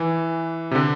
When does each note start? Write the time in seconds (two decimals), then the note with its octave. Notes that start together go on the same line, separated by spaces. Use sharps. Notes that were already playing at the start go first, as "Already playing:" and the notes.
Already playing: E3
0.71 C3
0.75 D3